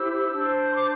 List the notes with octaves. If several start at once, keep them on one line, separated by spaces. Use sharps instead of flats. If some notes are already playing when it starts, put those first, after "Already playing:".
Already playing: E4 G4 C5 E6
D4 C5
C6
D6